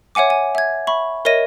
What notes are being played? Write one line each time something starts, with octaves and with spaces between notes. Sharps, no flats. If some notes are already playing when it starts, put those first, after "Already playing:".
C#5 E5 F#5 G#5 D6
G#5
E5 G#6
E5 B5 C#6
A#4 C#5 D#5 E5 A#6 D#7